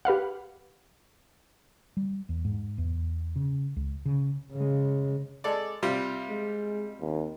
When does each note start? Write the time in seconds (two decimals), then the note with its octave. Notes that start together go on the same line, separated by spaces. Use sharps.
0.05 G4 B4 F5 F#5
1.97 G3
2.29 E2
2.45 G#2
2.78 E2
3.36 C#3
3.76 C#2
4.05 C#3
4.53 C#3 G#3
5.44 G#3 A4 D5
5.83 C3 G3 F4
6.30 G#3
7.00 D#2